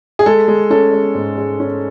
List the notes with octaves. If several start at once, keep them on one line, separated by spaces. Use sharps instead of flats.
G#4
G#3 A4
G#3
C#4 A4
G#3
G#2
G#3
C#4